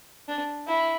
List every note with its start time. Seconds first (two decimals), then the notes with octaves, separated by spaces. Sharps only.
0.28 D4
0.68 E4